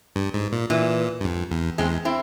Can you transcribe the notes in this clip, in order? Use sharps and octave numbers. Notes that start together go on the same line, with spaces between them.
G2
G#2
A#2
A#2 E3
G2
F2
E2
E2 G#3 C4
C4 E4